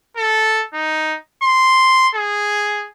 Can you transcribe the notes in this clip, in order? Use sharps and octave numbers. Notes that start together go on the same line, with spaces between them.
A4
D#4
C6
G#4